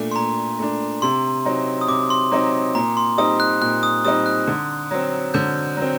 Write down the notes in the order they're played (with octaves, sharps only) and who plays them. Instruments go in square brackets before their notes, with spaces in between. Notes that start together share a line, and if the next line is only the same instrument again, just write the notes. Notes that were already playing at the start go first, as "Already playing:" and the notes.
Already playing: [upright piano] A#2 A3 D4
[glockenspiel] C6
[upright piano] A#2 [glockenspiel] A#5
[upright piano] A3 D4
[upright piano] C3 [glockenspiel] C6
[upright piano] F#3 C4 D#4
[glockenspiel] D#6
[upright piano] C3 [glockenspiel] D6
[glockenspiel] C6
[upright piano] F#3 C4 D#4
[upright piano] A#2 [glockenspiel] A#5
[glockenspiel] C6
[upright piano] G3 C4 D#4 [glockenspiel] D#6
[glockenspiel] F#6
[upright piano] A#2 [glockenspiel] F#6
[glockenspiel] D#6
[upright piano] G3 C4 D#4 [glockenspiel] D#6
[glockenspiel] F#6
[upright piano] D3
F#3 C4
[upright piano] D3 [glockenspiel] G6
[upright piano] F#3 C4